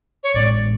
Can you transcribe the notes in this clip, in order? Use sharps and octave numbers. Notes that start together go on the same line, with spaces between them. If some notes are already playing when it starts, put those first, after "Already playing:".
C#5
A1 A2 G#3 B3 D5